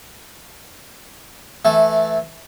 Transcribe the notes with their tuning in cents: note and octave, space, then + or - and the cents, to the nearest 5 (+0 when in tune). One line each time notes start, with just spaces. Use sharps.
E3 +0 A3 -15